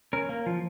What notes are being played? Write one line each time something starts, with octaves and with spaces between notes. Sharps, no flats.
C#4 A#4
A#3
F3